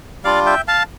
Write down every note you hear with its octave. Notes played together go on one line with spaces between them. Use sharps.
G3 D4 F4 D5 F5
E5 G5
F5 A5